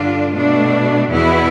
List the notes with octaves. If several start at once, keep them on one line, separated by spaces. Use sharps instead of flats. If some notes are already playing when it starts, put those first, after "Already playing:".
Already playing: G2 D3 G3 D4 F4
B2 A3 D4
E2 B2 B3 E4